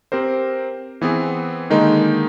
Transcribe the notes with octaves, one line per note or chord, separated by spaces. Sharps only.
C4 G4 A#4 C5
E3 B3 C4 G#4
D3 D#3 G#3 A#3 D#4